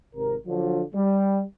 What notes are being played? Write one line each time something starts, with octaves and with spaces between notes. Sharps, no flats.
G#1 C3 A#4
D3 F3 F#3 D4 F4
G3